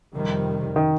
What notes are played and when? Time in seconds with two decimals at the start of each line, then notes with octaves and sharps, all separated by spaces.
0.14 F2 C3 D#3 G3
0.76 D#3